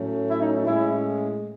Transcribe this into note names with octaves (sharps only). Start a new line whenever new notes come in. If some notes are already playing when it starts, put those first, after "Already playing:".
Already playing: A2 F#3 A3 C#4
E4
D#4
A2 G#3 C#4 E4